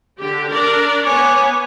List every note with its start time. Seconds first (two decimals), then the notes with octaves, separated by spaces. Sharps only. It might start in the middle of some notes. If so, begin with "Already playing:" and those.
0.20 D3 G4
0.51 D4 A#4 D5
1.04 B3 C#5 G#5 D6